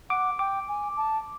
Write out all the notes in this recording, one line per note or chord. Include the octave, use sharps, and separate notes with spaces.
F#5 D6
G5 D6
G#5
A5